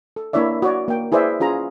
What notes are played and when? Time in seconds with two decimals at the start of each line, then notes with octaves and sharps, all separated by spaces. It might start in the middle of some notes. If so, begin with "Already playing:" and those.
0.16 A4
0.33 A#3 D4 E4 C#5 D5 E5
0.62 F#4 C#5 D5
0.88 A#3 G5
1.12 E4 G#4 B4 C5 D5 E5
1.40 C#4 F4 G#4 A#5